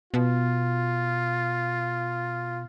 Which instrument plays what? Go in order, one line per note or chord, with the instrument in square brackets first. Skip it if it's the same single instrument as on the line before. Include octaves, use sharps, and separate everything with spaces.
[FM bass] B2 [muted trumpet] F4